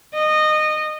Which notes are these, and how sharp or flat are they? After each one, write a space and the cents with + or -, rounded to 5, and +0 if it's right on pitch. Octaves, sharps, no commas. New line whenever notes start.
D#5 -20